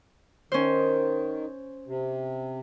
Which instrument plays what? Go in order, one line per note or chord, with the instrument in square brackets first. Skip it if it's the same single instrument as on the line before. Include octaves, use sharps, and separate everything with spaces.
[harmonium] D#3 [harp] C#4 C5
[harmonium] C3